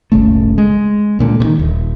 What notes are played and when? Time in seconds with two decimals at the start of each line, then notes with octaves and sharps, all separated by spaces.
0.12 D1 G1 C#3 A3
0.58 G#3
1.19 C#2 A#2 D3
1.40 C3 D#3
1.59 D#1